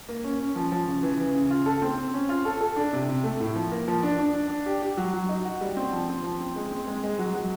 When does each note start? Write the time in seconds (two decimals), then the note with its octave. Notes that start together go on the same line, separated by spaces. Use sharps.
0.09 A#3
0.24 C#4
0.40 C#4
0.56 F3
0.72 F3
0.87 C#3
1.03 E3
1.19 C#3
1.35 C#3
1.50 F4
1.66 A4
1.82 C4
1.98 C4
2.14 C#4
2.29 F4
2.45 A4
2.61 A4
2.76 D4
2.93 C3
3.09 C3
3.24 A3
3.40 A2
3.56 F3
3.72 A#3
3.88 F3
4.03 D4
4.19 D4
4.35 D4
4.50 D4
4.66 G4
4.82 G4
4.97 F#3
5.13 F#3
5.29 D#4
5.45 F#4
5.61 G3
5.77 C4
5.93 F3
6.08 C4
6.24 F3
6.40 C4
6.56 G#3
6.71 C4
6.87 G#3
7.03 G#3
7.19 F#3
7.35 F#3